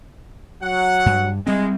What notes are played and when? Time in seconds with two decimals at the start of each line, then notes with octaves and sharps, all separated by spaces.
0.63 F#3 F#5
1.06 G2
1.47 G3 G#3 C4